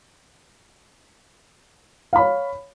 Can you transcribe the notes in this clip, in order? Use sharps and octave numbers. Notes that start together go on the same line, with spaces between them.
C#5 F5 B5